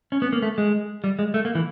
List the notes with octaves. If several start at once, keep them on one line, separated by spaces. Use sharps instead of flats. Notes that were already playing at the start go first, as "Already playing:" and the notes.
C#4
B3
A#3
A3
G#3
G3
G#3
A3
A#3
E3